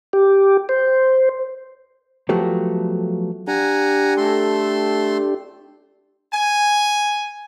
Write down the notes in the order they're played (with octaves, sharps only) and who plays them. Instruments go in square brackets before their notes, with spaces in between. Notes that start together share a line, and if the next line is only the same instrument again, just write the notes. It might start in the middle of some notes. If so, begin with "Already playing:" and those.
[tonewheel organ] G4
C5
[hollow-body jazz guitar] F3 F#3 A3 B3 G4
[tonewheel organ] D4 G4 [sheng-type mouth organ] F#5 G#5 A#5
[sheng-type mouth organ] A3 A4 C6
[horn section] G#5